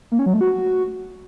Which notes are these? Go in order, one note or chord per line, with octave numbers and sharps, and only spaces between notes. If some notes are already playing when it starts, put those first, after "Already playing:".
A#3
C#4
F#3
A3
F#4